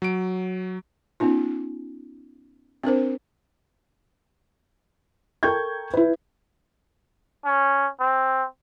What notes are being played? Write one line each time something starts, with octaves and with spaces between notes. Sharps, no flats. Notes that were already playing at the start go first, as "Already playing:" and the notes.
F#3 D7
B3 C#4 D#4 F4
C4 D4 A#4 C5
A4 A#4 G5 C#6 G6 G#6
E4 B4
C#4
C4